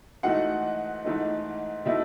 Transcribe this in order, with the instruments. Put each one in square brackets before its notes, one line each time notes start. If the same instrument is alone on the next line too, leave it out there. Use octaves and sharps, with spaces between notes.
[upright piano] G#2 E3 A3 D#4 F#4 F#5
G#2 E3 A3 D#4
B2 A3 D#4 E4 E5